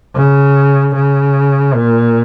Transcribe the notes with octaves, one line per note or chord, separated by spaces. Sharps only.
C#3
C#3
A#2